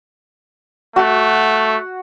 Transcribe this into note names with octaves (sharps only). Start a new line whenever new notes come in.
A3 F#4